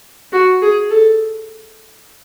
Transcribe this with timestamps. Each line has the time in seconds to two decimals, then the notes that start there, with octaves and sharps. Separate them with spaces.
0.32 F#4
0.62 G#4
0.91 A4